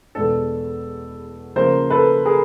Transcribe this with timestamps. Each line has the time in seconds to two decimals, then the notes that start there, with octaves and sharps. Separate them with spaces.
0.15 E2 B2 G#3 B3 D4 A4
1.56 C#3 F3 A#3 A#4 C5
1.90 A4 B4
2.25 G#4 A#4